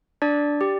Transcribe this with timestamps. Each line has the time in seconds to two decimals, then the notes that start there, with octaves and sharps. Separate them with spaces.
0.22 D4 D5
0.61 G4